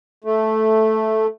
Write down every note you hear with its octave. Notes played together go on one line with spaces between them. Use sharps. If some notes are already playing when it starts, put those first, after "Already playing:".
A3